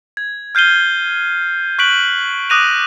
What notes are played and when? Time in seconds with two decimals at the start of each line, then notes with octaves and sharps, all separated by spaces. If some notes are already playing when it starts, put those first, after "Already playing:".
0.17 G#6
0.55 F6 G6 C7 D#7 G7
1.79 C#6 F#6 B6 D7 F#7
2.50 D6 D#6 F#6 A#6 D#7 F7